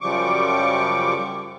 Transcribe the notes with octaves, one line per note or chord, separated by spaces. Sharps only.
F#2 C#3 F3 G3 C#6 D6